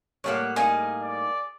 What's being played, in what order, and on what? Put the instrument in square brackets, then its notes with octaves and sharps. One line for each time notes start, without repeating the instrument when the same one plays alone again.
[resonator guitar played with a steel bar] A2 G3 A#3 [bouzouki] C#5 F5 F#5
[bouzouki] D#4 A#4 F5 [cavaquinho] G#4
[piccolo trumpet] D5